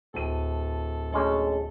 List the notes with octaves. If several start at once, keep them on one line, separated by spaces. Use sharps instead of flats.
D1 A4 D#7
D2 G#3 C#4 G#4 A4